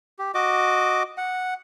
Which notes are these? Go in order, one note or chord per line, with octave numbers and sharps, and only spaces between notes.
G4
F#4 D#5 D6
F#5